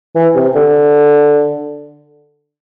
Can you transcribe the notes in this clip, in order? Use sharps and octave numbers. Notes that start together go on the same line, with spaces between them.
E3
C3
D3